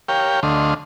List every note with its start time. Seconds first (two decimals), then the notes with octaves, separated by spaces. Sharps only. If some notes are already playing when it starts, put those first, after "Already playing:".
0.08 G4 A#4 C#5 F5 G5
0.43 D2 D3 A3 D#5 F5 C6